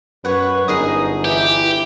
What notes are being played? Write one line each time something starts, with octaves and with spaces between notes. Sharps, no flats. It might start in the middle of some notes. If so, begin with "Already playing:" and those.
F#2 B4 C#5 F#5
G1 D#4 G#4 A#4 D#6
E3 G4